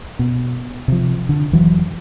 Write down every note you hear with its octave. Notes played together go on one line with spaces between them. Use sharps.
B2
C3 F3
D3
F1 E3 F#3